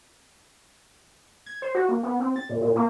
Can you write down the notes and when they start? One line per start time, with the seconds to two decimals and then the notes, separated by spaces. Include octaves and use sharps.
1.46 G#6
1.62 C5
1.75 F#4
1.89 A#3
2.03 B3
2.20 C4
2.36 A6
2.49 A#2
2.61 A#2
2.76 A#3